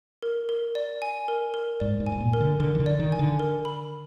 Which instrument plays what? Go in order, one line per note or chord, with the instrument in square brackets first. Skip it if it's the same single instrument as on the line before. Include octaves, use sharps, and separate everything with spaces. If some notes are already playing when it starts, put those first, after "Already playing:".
[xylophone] A#4
A#4
D5
G#5
A#4
A#4
[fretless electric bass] G#2 [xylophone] D5
[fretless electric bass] G#2
[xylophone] G#5
[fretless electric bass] G#2
A#2
[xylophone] A#4
[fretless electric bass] D3
[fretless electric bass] D3 [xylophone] A#4
[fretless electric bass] D#3
D3
[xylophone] D5
[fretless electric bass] D#3
[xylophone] G#5
[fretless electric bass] D3
[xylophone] A#4
B5